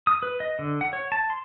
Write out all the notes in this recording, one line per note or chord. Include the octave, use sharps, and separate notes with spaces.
D#6
B4
D#5
D3
F#5
C#5
A5
C6